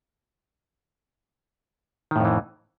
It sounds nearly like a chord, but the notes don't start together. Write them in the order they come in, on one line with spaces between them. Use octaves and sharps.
D#3 A2 F2 E3